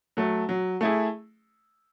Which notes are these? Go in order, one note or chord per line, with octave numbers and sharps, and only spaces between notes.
F#3 A3
F#3
A3 E4 G#4